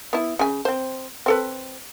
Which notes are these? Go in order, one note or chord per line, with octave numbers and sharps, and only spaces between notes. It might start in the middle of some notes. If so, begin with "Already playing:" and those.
B3 E4
C#3 G#5
C4 C5
C4 A4 B4